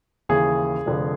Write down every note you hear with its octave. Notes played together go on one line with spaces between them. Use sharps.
D#2 C#3 E3 G#4
F1 F2 D3